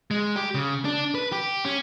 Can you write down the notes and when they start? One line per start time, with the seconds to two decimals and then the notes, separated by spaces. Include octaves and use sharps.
0.11 G#3
0.36 G4
0.55 C#3
0.85 D4
1.15 B4
1.32 G4
1.65 C#4